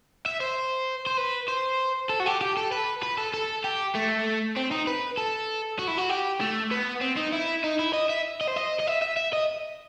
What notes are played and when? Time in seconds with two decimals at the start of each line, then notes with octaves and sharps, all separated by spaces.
0.26 E5
0.40 C5
1.07 C5
1.17 B4
1.48 C5
2.09 A4
2.20 F#4
2.26 G4
2.41 G4
2.57 A4
2.72 B4
3.03 B4
3.18 A4
3.34 A4
3.64 G4
3.95 A3
4.56 C4
4.71 D#4
4.87 B4
5.17 A4
5.79 F#4
5.88 E4
5.98 F#4
6.09 G4
6.41 A3
6.71 B3
7.01 C4
7.17 D#4
7.33 E4
7.64 D#4
7.79 E4
7.94 D#5
8.09 E5
8.41 D#5
8.48 C5
8.56 D#5
8.80 D#5
8.87 E5
9.02 E5
9.17 E5
9.33 D#5